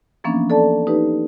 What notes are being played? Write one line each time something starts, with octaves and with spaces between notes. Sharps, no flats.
E3 F3 A#3 B3 C#4 D4
A4 D5 A5
D#4 G4 B4